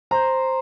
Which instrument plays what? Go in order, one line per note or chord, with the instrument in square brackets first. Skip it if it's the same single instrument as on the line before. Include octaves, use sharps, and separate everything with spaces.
[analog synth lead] C5 [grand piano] A#5